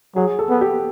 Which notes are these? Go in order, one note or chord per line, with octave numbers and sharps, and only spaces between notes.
F#3 G#4
A4
B3
G4